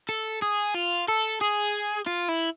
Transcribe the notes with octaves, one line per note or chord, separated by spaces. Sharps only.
A4
G#4
F4
A4
G#4
F4
E4